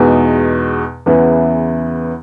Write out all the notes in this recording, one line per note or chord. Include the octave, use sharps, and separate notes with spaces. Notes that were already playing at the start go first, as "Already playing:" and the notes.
Already playing: E2 B2 G#3 D#4
E2 C#3 E3 B3 E4